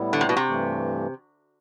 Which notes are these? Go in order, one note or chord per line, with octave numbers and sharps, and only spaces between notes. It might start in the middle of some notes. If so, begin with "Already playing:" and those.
Already playing: A2 G3 B3 E4
D3
C3
B2
C3
G2 E3 A3